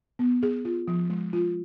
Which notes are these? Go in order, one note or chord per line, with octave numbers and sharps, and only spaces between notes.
B3
G#4
F4
F3
G#3
F4